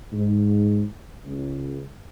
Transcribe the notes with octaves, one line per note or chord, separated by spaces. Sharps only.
G#2
C#2